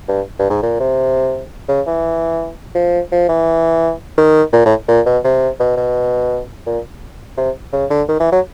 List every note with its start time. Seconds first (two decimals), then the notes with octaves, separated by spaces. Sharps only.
0.09 G2
0.39 G2
0.50 G#2
0.63 A#2
0.80 C3
1.69 C#3
1.87 E3
2.75 F3
3.12 F3
3.29 E3
4.18 D#3
4.53 A#2
4.66 A2
4.88 A#2
5.06 B2
5.24 C3
5.60 B2
5.77 B2
6.67 A#2
7.38 C3
7.73 C#3
7.90 D3
8.08 D#3
8.20 E3
8.32 F#3